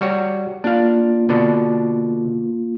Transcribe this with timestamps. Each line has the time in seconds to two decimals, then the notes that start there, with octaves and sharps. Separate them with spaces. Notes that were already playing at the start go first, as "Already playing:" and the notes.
0.01 G3 F#4 C#5
0.64 A#3 D4 F4 F5
1.29 B2 D3 D4